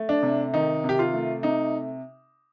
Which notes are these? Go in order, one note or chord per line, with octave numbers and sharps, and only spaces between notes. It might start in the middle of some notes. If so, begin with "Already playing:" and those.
Already playing: A3
D4
C3
D#3 D#4
C3 G4
F4
A3
C3 D#4